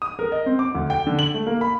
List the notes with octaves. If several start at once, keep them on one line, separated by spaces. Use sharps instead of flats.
D#6
A#4
D#5
C4
D6
D2
G5
D3
F#7
A3
A#3
B5